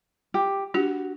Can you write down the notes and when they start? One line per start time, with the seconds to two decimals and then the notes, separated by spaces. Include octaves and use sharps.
0.34 G4
0.74 D4 F#4 G4